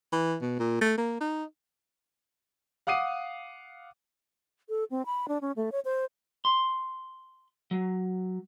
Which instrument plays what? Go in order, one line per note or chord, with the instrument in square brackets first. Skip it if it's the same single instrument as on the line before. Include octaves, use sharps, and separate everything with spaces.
[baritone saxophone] E3
B2
A#2
A3
A#3
D#4
[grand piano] F5 F#5 D6 D#6 C7 D#7
[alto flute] A4
C4
B5
D4
C#4
A3
C#5
C5
[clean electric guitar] C6
F#3